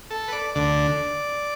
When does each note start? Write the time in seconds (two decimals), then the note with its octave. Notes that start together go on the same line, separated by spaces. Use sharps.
0.10 A4
0.28 B4
0.33 D5
0.55 D2 D3 D5